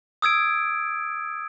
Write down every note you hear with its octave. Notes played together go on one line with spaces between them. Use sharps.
D#6 E6 G#6 D7